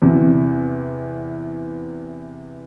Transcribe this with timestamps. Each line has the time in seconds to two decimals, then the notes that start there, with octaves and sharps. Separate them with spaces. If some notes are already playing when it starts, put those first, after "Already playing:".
0.02 E2 C3